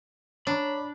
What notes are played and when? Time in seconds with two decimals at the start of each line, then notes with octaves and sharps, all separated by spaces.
0.47 D4 C#5 A#5 B5